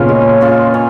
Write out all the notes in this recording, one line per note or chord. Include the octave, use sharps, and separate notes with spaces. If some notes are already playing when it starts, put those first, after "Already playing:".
Already playing: A#2 C#3 A#3 B3 C#4 F4
G#3
C#4 F4
C#4